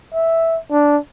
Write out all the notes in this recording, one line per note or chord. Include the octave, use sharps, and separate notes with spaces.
E5
D4